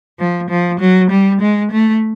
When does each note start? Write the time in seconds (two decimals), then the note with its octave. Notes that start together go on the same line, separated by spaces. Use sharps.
0.19 F3
0.50 F3
0.80 F#3
1.11 G3
1.41 G#3
1.72 A3